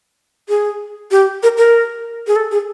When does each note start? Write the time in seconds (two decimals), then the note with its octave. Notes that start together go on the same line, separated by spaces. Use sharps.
0.49 G#4
1.11 G4
1.43 A#4
1.58 A#4
2.27 G#4
2.36 A4
2.51 G#4